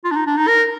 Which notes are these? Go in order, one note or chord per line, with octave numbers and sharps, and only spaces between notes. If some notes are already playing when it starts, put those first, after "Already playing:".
F4
D4
D#4
D4
D#4
A#4